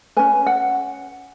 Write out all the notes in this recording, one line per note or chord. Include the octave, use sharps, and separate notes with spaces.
C#4 B4 G#5
F#5